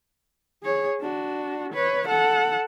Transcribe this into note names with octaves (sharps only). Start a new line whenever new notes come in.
G#4 C#5
D4 F#4
B4 C#5
A4 F#5